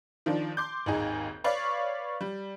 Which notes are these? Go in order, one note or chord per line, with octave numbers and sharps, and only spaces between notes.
D#3 F3 D4
C6 D6 G6
G#1 D#2 D#4 G#4
B4 C#5 D5 F5 C#6
G3